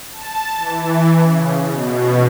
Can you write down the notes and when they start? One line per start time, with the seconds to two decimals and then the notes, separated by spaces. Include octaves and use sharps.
0.12 A5
0.56 E3
1.21 C#3
1.67 B2